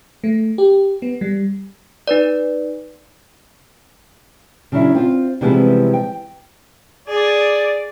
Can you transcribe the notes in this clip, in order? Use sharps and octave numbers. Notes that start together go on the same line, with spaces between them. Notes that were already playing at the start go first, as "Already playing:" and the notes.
A3
G4
B3
G3
D#4 B4 D5
C#3 F#3 D4 E4
C4 F4
C3 E3 F3 G3 G#3 B3
G5
G#4 D5